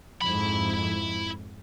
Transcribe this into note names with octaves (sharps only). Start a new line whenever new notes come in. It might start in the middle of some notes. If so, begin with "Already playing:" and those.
F2 G#2 E4 B5